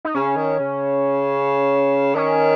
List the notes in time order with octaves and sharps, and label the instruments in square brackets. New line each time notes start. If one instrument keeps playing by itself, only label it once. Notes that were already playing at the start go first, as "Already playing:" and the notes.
[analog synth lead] D#4
[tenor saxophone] C#3 [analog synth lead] C#4
[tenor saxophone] D#3
C#3
[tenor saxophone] D#3 [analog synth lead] C#4